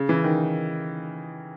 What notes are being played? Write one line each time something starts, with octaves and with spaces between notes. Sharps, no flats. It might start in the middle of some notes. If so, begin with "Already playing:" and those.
Already playing: C#3
E3
D#3